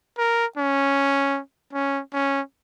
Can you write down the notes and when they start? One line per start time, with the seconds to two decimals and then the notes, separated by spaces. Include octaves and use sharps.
0.18 A#4
0.57 C#4
1.73 C#4
2.13 C#4